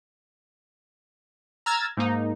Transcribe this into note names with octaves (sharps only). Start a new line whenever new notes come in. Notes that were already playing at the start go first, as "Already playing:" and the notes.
A#5 E6 F6 G#6 A6
G#2 A#3 D#4